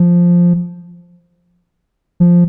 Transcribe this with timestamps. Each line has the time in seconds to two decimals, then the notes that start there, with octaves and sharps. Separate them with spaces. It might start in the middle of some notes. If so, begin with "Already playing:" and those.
Already playing: F3
2.20 F3